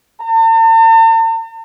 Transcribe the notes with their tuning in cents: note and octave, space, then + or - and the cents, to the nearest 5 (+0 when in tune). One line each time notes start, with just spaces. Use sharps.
A5 +45